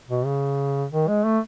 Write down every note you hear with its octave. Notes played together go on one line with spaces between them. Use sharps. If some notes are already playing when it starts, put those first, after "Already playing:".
B2
C#3
D#3
G#3
A3